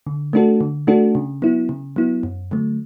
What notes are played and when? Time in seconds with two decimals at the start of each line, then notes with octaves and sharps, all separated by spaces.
0.07 D3
0.33 A3 D4 F#4 A4
0.61 D3
0.87 A3 D4 F#4 A4
1.15 C#3
1.42 F#3 B3 E4
1.69 C#3
1.96 F#3 B3 E4
2.23 F#2
2.51 D3 F#3 A3